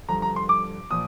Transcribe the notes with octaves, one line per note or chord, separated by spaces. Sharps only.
G2 D3 F3 A#5
A#5
C6
D6
A#2 F3 D#6